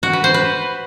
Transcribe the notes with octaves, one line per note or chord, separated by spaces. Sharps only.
F#4
B4
C5
B4